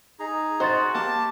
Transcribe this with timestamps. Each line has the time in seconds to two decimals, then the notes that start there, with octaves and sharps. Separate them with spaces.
0.20 D#4 G#4 A#5
0.60 F#4 C5 D#5 C6 A6
0.95 A#3 G4 A5